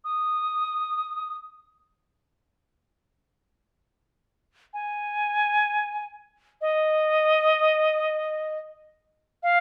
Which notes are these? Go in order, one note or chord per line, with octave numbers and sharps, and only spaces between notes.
D#6
G#5
D#5
F5